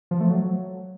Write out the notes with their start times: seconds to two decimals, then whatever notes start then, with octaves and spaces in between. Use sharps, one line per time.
0.11 F3
0.21 A3
0.30 F#3